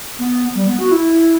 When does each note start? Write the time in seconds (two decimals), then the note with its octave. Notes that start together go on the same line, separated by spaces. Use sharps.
0.19 B3
0.55 G3
0.67 B3
0.80 F#4
0.92 E4